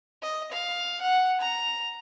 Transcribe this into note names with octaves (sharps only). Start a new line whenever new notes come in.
D#5
F5
F#5
A#5